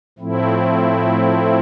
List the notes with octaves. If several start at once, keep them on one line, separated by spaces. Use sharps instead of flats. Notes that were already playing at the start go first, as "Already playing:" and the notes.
A2 F3 A3 C4 E4